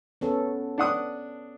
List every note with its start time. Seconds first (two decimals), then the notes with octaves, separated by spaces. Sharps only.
0.21 B3 C#4 A4
0.78 D4 F#5 D#6